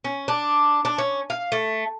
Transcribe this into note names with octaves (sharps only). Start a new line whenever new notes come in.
C#4
D4
D4
C#4
F5
A3